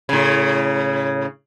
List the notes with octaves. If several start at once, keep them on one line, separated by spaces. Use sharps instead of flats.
A2 C#3